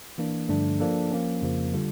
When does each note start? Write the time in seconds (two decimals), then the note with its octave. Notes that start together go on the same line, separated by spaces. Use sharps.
0.18 E3 A#3 D4
0.49 G2 D3 F3 A3 D4
0.80 F3 A#3 D4 A4
1.11 F3 A#3 C#4
1.42 F2 C#3 F3 A#3
1.74 D3 G3 D4 F4